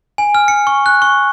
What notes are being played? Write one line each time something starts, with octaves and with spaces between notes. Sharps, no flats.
G#5
F6
C#7
C#6
F#6
C#6